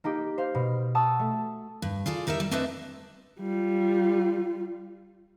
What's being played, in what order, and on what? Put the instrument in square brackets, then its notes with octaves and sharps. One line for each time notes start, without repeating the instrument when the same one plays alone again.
[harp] A#3 D#4 G4
C5 F5
B2
F#5 A5 C#6 D#6 E6
A3
[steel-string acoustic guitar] G2
F4 G#4 A4 D5
G3 D#4 A#4 C#5 E5
G3
A3 C4 D4 B4 D#5 E5
[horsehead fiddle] G3 F4